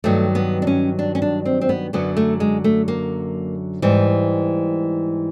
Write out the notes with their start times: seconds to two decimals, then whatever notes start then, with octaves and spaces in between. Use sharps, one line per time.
0.04 G2 D#3 F#3 A3
0.35 B3
0.62 D4
0.67 C#4
0.99 D4
1.15 C#4
1.22 D4
1.45 C4
1.61 C4
1.69 B3
1.93 F#2 D3 F#3 B3
2.17 A3
2.40 G#3
2.64 A3
2.88 A#3
3.82 G#2 E3 G3